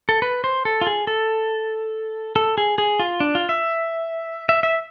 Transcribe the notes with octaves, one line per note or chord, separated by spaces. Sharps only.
A4
B4
C5
A4
F4
G#4
A4
A4
G#4
G#4
F4
D4
F4
E5
E5
E5